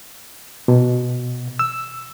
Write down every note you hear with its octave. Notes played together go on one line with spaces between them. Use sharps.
B2
E6